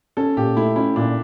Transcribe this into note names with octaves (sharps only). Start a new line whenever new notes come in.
C#4 A4
A#2 G4
A3 E4
C#4 E4
A#2 D4